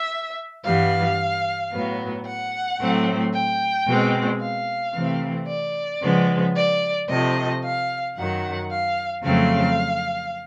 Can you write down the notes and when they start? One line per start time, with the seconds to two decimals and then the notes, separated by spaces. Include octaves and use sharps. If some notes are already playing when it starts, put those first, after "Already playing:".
Already playing: E5
0.65 G2 E3 G3 B3 F5
1.73 A2 F#3 B3
2.26 F#5
2.80 A2 F#3 A3 C4
3.34 G5
3.88 B2 G#3 C4
4.41 F5
4.95 C3 E3 A3 C4
5.48 D5
6.03 C#3 F3 G#3 B3
6.55 D5
7.10 C3 F3 A3 D#5
7.63 F5
8.17 F#2 D#3 F#3 F#5
8.71 F5
9.24 F2 C#3 F#3 A3 C4 F5